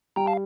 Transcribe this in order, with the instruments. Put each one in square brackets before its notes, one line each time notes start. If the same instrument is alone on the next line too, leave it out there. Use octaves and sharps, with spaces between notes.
[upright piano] G3 [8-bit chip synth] G5 A#5
[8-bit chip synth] F5 A5